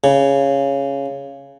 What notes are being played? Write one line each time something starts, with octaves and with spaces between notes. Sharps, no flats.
C#3